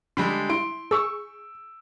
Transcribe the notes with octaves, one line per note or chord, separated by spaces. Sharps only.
D3 G3 G#3 B5
E4 C6 D7
G#4 C#6 E6